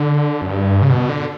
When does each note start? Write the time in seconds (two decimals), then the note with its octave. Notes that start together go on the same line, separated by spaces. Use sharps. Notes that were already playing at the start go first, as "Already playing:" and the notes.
Already playing: D3
0.42 F#2
0.50 G2
0.82 C#3
0.90 B2
1.09 D3